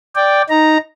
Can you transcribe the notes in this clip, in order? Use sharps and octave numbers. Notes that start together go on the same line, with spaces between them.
D5 G5
D#4 A#5